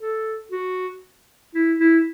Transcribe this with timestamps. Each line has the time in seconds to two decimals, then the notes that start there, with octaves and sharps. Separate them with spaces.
0.01 A4
0.52 F#4
1.55 E4
1.80 E4